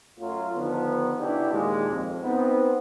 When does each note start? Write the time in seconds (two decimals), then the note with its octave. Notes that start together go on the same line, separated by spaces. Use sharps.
0.18 F#2 F#3 A3 F4
0.55 D3 D#3 F3 B3
1.18 C#3 E3 D4 E4 F#4 G4
1.51 D#2 A#2 G#3
1.89 F2
2.22 B3 C4 D#4